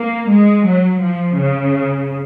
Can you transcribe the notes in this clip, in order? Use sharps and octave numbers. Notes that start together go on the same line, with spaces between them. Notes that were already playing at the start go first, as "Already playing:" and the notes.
Already playing: A#3
G#3
F#3
F3
C#3